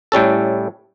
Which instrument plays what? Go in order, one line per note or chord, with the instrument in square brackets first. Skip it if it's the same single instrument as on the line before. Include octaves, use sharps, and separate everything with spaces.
[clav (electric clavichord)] A2 G3 C#4 A4